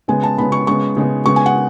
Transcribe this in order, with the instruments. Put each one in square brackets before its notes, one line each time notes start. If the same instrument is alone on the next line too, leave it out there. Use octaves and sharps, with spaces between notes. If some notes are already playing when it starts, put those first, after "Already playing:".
[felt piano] C#3 G#3 B3 G#5
A5
C#3 G#3 B3 B5
C#6
C#3 G#3 B3 C#6
C#3 G#3 B3
C#3 G#3 B3 C#6
G#5
F#5